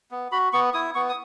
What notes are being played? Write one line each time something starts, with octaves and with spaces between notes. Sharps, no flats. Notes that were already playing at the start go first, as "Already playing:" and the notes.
B3
F#4 B5
B3 C#6
E4 D#6
B3 C#6
D#6